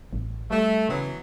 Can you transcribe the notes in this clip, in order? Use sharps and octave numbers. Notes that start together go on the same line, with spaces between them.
A1
G3 A3
C#3 E3 F#3 B3